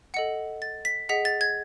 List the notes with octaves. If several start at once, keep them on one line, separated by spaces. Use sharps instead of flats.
A4 D#5 F#5 C#7
A6
B6
G#4 D#5 F#5 B6
A6
G#6